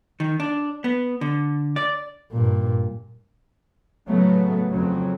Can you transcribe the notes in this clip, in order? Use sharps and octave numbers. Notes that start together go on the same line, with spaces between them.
D#3
D4
B3
D3
D5
G2 A#2
A2 C#3 F#3 A3 B3
F2 C#3 F#3